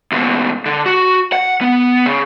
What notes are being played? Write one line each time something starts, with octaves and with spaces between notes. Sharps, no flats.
D#2 B2
D3
F#4
F#5
B3
C#3